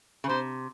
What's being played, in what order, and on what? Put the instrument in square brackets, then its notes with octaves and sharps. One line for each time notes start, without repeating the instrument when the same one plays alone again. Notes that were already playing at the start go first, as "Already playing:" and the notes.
[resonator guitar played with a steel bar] C#3
[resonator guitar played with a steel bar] C3 [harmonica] C5